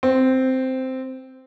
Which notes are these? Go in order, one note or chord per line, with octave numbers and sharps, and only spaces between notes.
C4